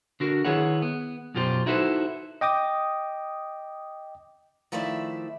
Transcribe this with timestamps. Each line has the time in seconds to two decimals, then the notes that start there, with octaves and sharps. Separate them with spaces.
0.20 D3 F#4 A#4
0.45 D#3 E4 G#4 B4 C#5 F#5
0.82 B3
1.35 F#2 B2 F4 G4 C5
1.66 D#4 E4 F#4 A4 B4 C5
2.41 D#5 G5 D6 D#6
4.72 D#3 F3 A3 E4 D5 E5